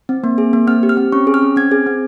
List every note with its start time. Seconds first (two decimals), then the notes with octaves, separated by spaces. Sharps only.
0.09 C4
0.24 A#3
0.38 G#4
0.53 A#3
0.67 C4 F6
0.83 G4
0.89 F6
0.97 C4
1.12 C#4 C#6
1.27 G#4
1.34 F6
1.42 C#4
1.56 C4 G#6
1.71 G#4
1.86 C4